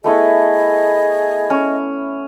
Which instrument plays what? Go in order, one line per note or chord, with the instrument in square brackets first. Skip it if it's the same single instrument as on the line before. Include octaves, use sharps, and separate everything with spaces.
[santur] A3 B3 E4 [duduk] G#4 [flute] D#5
[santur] C#4